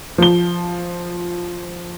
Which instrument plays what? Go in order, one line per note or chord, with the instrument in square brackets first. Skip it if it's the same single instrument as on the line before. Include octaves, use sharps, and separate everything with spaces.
[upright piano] F3 G7